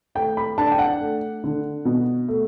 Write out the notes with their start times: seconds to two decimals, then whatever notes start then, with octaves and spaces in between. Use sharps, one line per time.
0.15 A3 G5
0.37 B5
0.58 D4 A5
0.72 G5
0.79 F#5
1.00 A3
1.44 D3
1.85 B2
2.28 A3